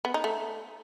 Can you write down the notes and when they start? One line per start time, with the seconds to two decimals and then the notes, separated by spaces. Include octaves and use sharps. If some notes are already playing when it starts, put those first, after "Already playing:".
0.05 B3
0.14 D#4
0.24 A3